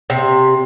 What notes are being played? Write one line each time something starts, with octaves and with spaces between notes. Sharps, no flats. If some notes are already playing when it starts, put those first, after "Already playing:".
C3